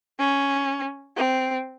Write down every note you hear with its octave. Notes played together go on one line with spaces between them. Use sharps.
C#4
C4